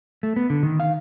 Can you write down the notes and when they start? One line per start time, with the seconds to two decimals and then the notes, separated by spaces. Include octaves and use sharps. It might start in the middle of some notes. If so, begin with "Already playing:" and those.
0.23 A3
0.36 B3
0.50 D3
0.63 D#3
0.80 F5